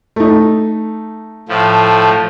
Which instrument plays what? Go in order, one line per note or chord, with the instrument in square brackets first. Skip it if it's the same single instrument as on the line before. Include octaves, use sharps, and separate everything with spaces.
[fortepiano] A3 D#4
[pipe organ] A2 F3